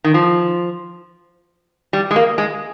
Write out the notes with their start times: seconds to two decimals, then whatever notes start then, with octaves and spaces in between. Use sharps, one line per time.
0.04 D#3
0.14 F3
1.93 G3
2.11 G#3
2.16 A#3
2.38 G#3